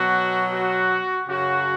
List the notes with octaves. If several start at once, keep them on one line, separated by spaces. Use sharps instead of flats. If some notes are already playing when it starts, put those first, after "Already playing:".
Already playing: B2 F#3 F#4
F#4
F#2 C#3 F#3 F#4